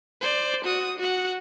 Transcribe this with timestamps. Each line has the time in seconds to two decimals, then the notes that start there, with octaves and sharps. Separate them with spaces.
0.21 C5 D5
0.64 F#4 D#6
0.99 F#4 F#5